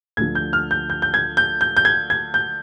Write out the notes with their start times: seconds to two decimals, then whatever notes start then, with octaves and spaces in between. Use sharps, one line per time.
0.17 D2 D3 F3 G#6
0.35 G6
0.53 F6
0.71 G6
0.90 G6
1.02 G6
1.14 G#6
1.37 G6
1.61 G6
1.77 G6
1.85 G#6
2.10 G#6
2.34 G6